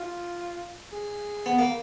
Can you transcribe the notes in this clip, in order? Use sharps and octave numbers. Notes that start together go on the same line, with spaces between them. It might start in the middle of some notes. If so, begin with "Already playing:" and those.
Already playing: F4
G#4
B3
A#3